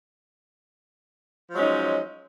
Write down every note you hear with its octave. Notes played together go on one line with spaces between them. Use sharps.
F3 F#3 G#3 C#4 D#4